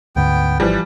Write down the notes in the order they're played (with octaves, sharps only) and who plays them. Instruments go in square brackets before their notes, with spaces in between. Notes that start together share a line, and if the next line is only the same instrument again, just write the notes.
[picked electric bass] D2 G#2 D3 [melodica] B3 G5
[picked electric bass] G#1 [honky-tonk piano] E3 F3 G3